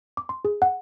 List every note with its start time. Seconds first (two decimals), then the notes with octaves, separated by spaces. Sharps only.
0.17 D6
0.29 C6
0.45 G#4
0.62 F#5